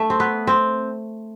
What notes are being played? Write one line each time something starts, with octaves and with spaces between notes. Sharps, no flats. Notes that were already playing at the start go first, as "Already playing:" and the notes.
Already playing: A3
C4
B3
C4